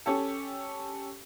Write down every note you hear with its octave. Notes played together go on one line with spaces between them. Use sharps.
C#4 G4 A4